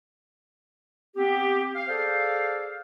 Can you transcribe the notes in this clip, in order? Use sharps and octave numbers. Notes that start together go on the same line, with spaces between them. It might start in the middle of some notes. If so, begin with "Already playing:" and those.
B3 C4 G4
F5
G#4 A4 C5 D5 F5